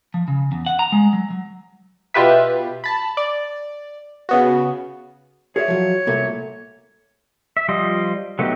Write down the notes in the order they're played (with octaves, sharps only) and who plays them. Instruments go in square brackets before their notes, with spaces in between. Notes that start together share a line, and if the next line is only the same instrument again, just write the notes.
[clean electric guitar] F3
C#3
E2
F#5
A#5
G#3
F#3
F#3
[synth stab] B2 F4 G4 B4 E5
A5 B5
D5
C#3 B3 F#4
[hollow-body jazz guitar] G#4 D5 E5 [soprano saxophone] C#5
[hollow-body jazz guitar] F3 F#3
C2 A#2 A3
[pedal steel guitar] E5
F3 G3 F4 C5 D#5
F#3 A3 B3 D#4 G4